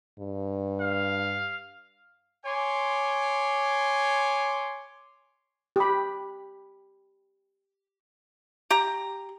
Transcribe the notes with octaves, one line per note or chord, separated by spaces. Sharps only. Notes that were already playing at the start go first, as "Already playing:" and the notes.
G2
F5
C#5 G#5 C6 D6
G4 B5
G4 A#5